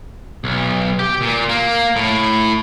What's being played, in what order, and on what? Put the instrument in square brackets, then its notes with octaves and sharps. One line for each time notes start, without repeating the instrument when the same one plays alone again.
[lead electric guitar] B1
G4
A#2
A#3
A2